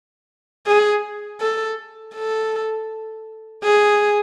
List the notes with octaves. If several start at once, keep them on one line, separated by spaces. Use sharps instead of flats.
G#4
A4
A4
G#4